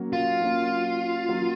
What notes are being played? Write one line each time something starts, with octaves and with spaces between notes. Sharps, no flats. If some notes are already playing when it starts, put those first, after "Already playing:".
Already playing: F#3 A#3 C#4
F4
F#3 A#3 C#4
F#3 A#3 C#4